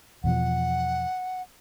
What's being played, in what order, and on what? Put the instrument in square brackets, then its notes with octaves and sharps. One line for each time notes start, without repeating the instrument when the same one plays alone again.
[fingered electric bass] E2 B2 F3 [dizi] F#5